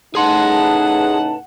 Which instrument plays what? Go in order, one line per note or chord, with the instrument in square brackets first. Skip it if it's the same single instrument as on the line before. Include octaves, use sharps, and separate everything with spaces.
[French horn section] A2 C#3 D#4 [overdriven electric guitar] G#4 C6 [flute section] B4 A5 [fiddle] F#5